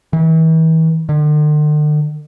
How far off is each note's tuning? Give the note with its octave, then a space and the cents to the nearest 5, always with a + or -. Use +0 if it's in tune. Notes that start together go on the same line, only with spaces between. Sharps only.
E3 -40
D3 +45